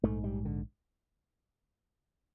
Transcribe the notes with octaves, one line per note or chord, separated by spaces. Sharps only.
A#1 G#2 A3
G3
D3